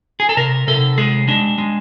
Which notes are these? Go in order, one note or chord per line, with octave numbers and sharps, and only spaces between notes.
G#4
A4
C3 A#4
C3 A4
G#3 G#4
G#3 D4
G#3